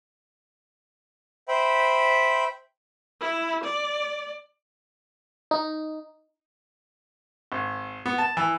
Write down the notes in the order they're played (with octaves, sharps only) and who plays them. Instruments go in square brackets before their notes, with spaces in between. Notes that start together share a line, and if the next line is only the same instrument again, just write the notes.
[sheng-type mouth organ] C5 E5 G5 B5
[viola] E4
D5
[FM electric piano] D#4
[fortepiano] G#1
B3
A5
E3